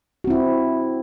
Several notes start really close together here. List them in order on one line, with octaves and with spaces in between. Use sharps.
F#4 C4 E4